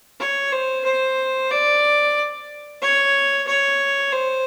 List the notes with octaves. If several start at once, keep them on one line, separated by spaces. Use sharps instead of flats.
C#5
C5
C5
D5
C#5
C#5
C5